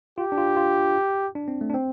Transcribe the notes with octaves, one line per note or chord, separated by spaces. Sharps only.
F4 G4
D4
F4
F4
D4
C4
A3
D4
C4